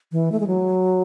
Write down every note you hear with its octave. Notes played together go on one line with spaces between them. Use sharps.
E3
A3
G#3
F#3